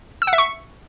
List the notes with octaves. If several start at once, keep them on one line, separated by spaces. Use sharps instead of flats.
E6
F#5
E5
C#6